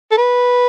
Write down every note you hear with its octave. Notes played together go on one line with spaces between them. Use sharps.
A4
B4